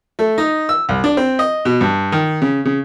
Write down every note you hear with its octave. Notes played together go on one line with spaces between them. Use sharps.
A3
D#4
E6
C2
D4
C4
D#5
B2
G2
D#3
C#3
C#3